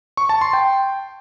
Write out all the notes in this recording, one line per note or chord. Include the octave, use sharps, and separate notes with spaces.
C#6
A5
C6
G5